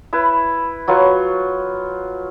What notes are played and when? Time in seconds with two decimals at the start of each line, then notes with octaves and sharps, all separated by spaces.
0.13 E4 B4
0.88 F#3 F4 B4 C#6